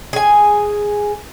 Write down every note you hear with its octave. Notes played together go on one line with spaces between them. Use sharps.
G#4 G#5